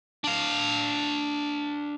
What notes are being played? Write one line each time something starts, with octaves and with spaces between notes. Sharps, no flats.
D4 F5